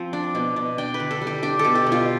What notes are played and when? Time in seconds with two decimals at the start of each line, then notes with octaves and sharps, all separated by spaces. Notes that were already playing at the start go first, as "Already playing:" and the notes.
Already playing: F3 C4
0.13 D4
0.35 B2
0.56 B2
0.78 D4 G5
0.94 B4
1.00 D3
1.11 A4
1.22 G3
1.27 G4
1.43 D4 G4
1.59 A4
1.65 B2
1.75 G4
1.86 B2
1.92 F4